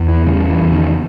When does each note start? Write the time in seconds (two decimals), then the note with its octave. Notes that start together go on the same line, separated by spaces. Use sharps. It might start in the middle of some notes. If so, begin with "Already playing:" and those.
Already playing: E2
0.08 E3
0.26 C#3 G3
0.50 E3
0.61 E2
0.73 D#3